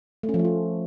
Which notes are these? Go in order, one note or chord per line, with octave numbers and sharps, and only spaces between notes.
A3
C#4
F3
A3
F4